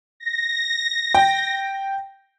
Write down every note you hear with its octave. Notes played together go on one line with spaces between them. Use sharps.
A#6
G5